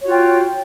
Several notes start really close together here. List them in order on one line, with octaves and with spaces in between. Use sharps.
C#5 F#4 F4 G5